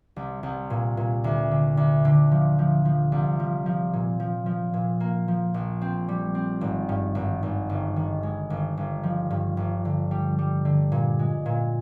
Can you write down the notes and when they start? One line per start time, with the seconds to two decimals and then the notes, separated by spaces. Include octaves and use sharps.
0.16 C2
0.43 C2
0.70 A#2
0.97 A#2
1.24 D2
1.51 D3
1.77 D2
2.05 D3
2.32 F3
2.59 F3
2.85 F3
3.12 C2
3.40 F3
3.66 F3
3.93 A#2
4.20 F3
4.46 F3
4.74 A#2
5.00 A#3
5.28 F3
5.54 A#1
5.81 C4
6.08 G3
6.35 C4
6.61 G#1
6.89 G2
7.15 G#1
7.43 G#1
7.69 G1
7.96 D#3
8.23 G#3
8.50 G1
8.77 G1
9.03 F3
9.30 G2
9.57 G1
9.85 D3
10.11 G3
10.39 G3
10.65 D3
10.92 A#2
11.19 G#3
11.46 A#2